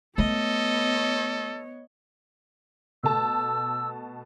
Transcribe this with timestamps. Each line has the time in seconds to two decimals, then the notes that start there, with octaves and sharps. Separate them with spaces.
0.18 A3 B3 A4 C#5 D#5
3.03 B2 A3 A5 E6